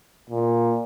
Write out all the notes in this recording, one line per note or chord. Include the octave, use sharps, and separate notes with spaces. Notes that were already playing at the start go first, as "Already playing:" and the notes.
A#2